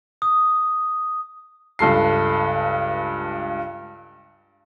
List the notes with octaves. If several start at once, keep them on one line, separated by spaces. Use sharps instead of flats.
D#6
C#2 G2 A4 C7